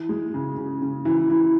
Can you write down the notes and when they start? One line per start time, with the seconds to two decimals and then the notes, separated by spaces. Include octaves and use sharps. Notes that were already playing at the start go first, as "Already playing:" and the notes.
Already playing: E3
0.09 G#3
0.34 C#3
0.58 C#3
0.82 C#3
1.05 E3
1.30 E3